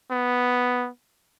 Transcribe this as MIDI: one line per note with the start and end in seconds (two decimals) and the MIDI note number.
0.11 0.89 59